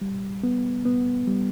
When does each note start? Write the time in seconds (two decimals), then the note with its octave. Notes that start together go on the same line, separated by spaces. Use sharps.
0.02 G3
0.43 B3
0.85 B3
1.28 G3